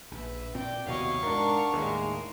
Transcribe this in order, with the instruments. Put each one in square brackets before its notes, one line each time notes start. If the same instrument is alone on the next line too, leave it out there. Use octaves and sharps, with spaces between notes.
[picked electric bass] A#1 [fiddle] B4 E5
[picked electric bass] A#2 C4 [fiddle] D5 G5
[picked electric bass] F1 D#2 B2 [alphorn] F#3 [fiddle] E4 D#5 [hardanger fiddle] F5 C#6
[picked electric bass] G#2 [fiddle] D4 F#5 [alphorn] A#4
[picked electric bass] D#2 A2 [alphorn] G#3 [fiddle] A#3 A#4